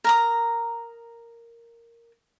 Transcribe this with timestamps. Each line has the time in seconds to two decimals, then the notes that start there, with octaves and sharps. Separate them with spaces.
0.04 A#4 A#5 D#6